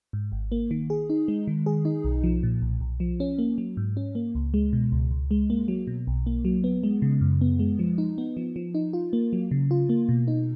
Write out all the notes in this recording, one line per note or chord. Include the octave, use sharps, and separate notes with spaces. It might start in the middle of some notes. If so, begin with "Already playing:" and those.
G#2
G#1
A#3
D#3
G#4
D#4
G#3
D#3
G#4
D#4
B1
F3
A#2
B1
B1
F3
C#4
A#3
F#3
G#2
C#4
A#3
C#2
G#3
B2
C#2
C#2
G#3
A#3
F#3
B2
B1
A#3
F#3
B3
G#3
C#3
F#2
B3
G#3
F3
D#4
B3
F3
F3
D#4
F4
A#3
F#3
C#3
F4
A#3
B2
D#4